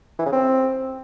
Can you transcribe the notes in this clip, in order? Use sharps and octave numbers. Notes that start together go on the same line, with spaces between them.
E3
C#3
C4